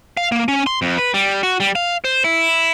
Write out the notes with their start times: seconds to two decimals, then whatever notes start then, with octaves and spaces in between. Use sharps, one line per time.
0.17 F5
0.32 A#3
0.48 C#4
0.67 C6
0.82 F2
0.98 B4
1.14 G3
1.43 F#4
1.60 G3
1.76 F5
2.04 C5
2.24 E4